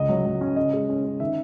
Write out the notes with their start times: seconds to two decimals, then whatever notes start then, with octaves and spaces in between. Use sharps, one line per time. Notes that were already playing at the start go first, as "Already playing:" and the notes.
Already playing: C#2 D#5
0.09 F#3
0.25 F#3
0.41 C#4
0.56 C#3 D#5
0.73 G#3
0.89 C#4
1.04 C#4
1.20 D#3 E5